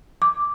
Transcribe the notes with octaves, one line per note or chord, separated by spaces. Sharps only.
D6